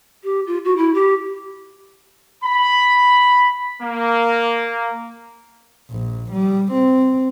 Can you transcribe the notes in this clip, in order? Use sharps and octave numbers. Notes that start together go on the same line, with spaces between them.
G4
F4
F#4
E4
G4
B5
A#3
A#1
G3
C4